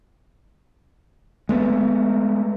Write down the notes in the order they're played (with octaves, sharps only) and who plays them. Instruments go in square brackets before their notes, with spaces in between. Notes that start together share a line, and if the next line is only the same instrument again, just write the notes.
[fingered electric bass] G#3 A3 B3